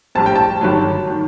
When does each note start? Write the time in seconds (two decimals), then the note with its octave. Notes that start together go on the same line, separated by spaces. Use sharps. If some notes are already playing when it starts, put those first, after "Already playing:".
0.15 A#1 A2 G3 C4 A5
0.26 G5
0.36 A5
0.61 G1 G2 D#3 F#3
1.07 D#3 F#3